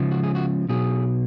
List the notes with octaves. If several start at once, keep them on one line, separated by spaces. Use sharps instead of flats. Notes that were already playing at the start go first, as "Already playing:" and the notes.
Already playing: C#2 C#3 F3
F#4
G#4
F#4
B1 B2 F#3 G#4